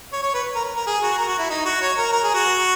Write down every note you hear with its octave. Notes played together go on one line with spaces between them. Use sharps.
C#5
C#5
B4
A#4
A#4
G#4
F#4
A#4
F#4
E4
D#4
F#4
C#5
A#4
A#4
G#4
F#4